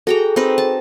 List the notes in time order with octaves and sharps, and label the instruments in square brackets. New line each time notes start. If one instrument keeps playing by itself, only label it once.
[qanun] F#4 G5 A#5 [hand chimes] G#4 A4
[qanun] C4 D#4 B4
A5